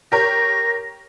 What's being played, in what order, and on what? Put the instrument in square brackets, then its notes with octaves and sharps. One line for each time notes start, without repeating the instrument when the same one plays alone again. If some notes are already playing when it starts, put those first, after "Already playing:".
[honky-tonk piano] G4 A#4 C#5 [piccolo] A#6